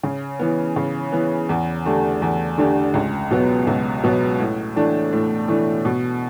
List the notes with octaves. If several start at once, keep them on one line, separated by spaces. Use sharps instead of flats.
C#3
E3 B3
C#3
E3 B3
E2
D3 A3 D4 G4
E2
D3 A3 D4 G4
C#2
B2 F#3 B3
C#2
B2 F#3 B3
A2
E3 A3 D4
A2
E3 A3 D4
B2